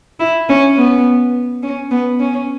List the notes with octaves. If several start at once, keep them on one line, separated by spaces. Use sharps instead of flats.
E4
C#4
B3
C#4
B3
C#4